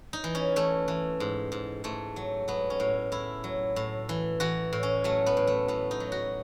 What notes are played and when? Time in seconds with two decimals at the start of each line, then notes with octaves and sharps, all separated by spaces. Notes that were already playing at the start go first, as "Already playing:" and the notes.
0.13 D#4
0.24 E3
0.35 C#4
0.56 E3 A3
0.88 E3
1.20 G#2
1.52 G#2
1.84 G#2 A3
2.16 F#3
2.48 F#3 B3
2.70 C#4
2.80 A2
3.12 A2 E4
3.44 F#3
3.76 A2
4.09 E3
4.40 E3 F#4
4.73 A2
4.83 C#4
5.04 F#3 A3
5.26 B3
5.37 A2
5.47 A3
5.68 A2 B3
5.91 D#4
6.00 F#3
6.12 F#4